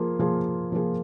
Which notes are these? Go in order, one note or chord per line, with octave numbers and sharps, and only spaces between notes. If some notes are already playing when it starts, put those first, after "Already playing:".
Already playing: F3 A#3 F4 G#4
F3 A#3 F4 G#4
F3 A#3 F4 G#4